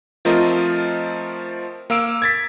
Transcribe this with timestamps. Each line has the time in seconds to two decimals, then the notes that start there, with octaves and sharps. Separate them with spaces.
0.25 F3 A3 C4 F4 A#4 D#5
1.90 A#3 F5 E6 D7
2.22 G#6 A6 B6